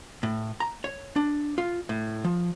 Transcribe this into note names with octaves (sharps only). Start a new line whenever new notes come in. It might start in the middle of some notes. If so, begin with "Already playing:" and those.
A2
A#5
C#5
D4
F4
A2
F3